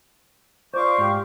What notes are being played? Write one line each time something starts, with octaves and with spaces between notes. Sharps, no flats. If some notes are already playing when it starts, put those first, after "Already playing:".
F4 C5 D5 C#6 D6
G#2 G4